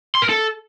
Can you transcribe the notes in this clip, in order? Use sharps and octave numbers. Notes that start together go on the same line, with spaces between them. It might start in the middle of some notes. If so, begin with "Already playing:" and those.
C6
A#4
A4